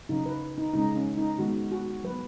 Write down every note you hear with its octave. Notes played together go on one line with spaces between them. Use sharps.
C#3 F#3 C#4 D#4
B4
D#4
C#3 G#3 C#4 D#4
C#4
D#4
D#3 G#3 B3 F#4
F#4
F#3 B3 B4